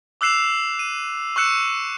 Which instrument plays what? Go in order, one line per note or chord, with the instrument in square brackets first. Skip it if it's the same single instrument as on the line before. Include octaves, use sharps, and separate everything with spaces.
[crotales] D6 E6 F#6 C7 E7 F7
D#7
C#6 E6 F#6 C#7 E7